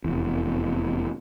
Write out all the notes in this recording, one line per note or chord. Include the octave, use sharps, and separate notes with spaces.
F1 E2